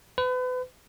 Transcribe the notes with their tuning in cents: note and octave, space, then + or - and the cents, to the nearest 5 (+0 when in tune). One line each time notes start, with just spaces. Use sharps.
B4 +35